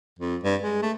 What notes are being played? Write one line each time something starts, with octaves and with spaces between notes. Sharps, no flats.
F2
G2
G#3
A3